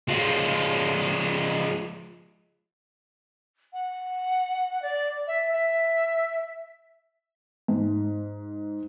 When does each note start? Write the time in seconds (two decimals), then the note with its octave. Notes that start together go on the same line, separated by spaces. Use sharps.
0.08 F3 G#3
3.73 F#5
4.82 D5
5.27 E5
5.52 E5
7.68 G#2